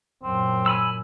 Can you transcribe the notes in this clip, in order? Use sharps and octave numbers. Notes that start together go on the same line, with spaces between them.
F#2 A#2 C4
G#5 B5 E6